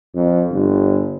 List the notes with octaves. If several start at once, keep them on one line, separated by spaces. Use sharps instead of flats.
F2
G1